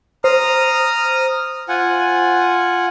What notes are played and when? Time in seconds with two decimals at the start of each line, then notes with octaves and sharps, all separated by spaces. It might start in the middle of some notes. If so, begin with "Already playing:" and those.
0.24 C5 A#5 D#6 F6
1.69 F4 F#5 G#5